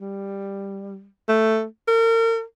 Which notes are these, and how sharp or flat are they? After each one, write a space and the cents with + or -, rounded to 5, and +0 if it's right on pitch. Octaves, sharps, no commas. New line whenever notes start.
G3 +10
A3 +5
A#4 -40